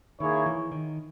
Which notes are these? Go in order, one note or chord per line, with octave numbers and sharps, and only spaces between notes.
D#3 A#3 E4 G#4 C#5
E3
D#3